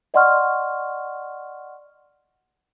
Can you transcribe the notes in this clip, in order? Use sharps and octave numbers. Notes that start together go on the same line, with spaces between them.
D5 D#5 F#5 C6 C#6 F6